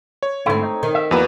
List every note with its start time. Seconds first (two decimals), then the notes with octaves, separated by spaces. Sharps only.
0.23 C#5
0.46 G#2 D3 A3 C4 E4
0.63 D#4
0.83 D#3
0.95 E5
1.11 E2 F3 G3 A#3 F#4 B4